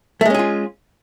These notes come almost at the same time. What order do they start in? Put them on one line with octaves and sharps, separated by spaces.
A3 G#3 C#4 G#4 F4